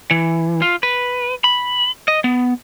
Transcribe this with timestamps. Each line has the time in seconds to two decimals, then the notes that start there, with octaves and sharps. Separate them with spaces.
0.11 E3
0.62 F4
0.83 B4
1.44 B5
2.08 D#5
2.24 B3